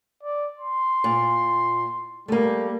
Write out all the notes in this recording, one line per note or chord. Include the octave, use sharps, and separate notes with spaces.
D5
C6
A#2
G3 A3 A#3